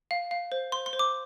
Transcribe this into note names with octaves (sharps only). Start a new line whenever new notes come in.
F5
F5
C5
C5 C6
C6
C5
D6